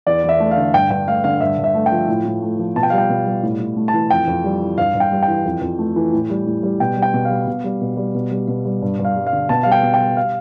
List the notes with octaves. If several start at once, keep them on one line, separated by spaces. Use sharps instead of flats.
E2 D5
E2
E5
A3
F5
D3
G2 G5
G2 G5
A3 F5
D3 F5
G2 E5
G2
E5
A3
G5
F3
A2
A2
A3
F3
B2 A5
G5
G3 F5
G5
B2
G3
A2
A2
A3
A5
E3
F2 G5
F2
G3
E3
G2 F5
G2
G5
G3
G5
E3
F2
F2
A3
E3
A2
G3
A2
G3
B2 G5
G3
G5
B2
F5
G3
B2
G3
B2
G3
B2
G3
B2
G3
G2
G2
F5
G3
F5
D3
B2 A5
G3 F5
G5
B2
G5
G3
F5